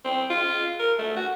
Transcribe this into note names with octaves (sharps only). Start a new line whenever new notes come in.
C4
F4
A#4
A3
F#4